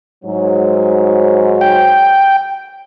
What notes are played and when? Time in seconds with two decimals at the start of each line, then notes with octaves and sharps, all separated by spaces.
0.25 G#2 F#3
1.61 G5